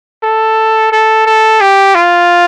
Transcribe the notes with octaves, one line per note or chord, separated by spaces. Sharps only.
A4
A4
A4
G4
F4